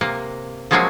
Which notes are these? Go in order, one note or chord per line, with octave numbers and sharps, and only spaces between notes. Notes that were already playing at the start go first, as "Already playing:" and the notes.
C3 A#3
F3 F#3 G#3 A#3 C4 C#4